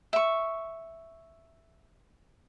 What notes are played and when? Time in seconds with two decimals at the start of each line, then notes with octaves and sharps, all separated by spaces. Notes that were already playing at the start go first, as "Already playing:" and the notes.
0.13 E5 C#6